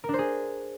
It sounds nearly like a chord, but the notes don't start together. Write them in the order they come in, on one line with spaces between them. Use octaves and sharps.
A#4 D4 C5 G#4